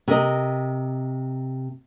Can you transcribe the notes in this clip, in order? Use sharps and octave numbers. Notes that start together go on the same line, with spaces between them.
C3 A#4 D#5